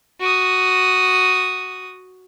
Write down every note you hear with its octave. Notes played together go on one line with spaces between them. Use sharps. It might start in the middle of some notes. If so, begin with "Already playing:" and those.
F#4 D#6